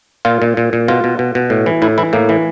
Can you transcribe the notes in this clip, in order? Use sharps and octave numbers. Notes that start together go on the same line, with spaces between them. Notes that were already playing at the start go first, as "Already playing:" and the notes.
A#2 F4
A#2
A#2
A#2
B2 F4
B2
B2
B2
A2
E3
A2 E4
E3 E4
A2 A#3
E3